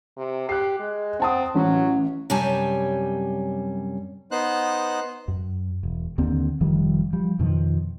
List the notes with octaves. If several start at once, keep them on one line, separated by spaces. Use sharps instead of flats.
C3
G4 F#6 C7
G#3
C4 F#5 A5 D#6
A1 F#3 C#4
F#2 C3 G3 C#5 G#5 A5
B3 D#4 C5 F#6
F#2
E1
D#2 D3 A#3 C4
F1 D#3 F3 G3
F3 G3
F2 B2 D#3 F3